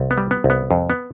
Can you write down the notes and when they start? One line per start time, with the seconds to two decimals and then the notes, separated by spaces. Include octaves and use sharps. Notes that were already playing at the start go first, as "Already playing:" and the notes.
Already playing: C2
0.11 B3
0.18 G3
0.31 B3
0.44 C2
0.50 B3
0.71 F2
0.90 B3